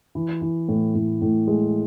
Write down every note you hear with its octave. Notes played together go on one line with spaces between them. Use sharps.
E3
E3
A2
A2
A2
G#3